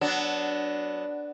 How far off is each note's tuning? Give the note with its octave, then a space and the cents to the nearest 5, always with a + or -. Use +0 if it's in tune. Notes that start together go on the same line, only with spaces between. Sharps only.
F#3 +20 B3 +0 D4 +0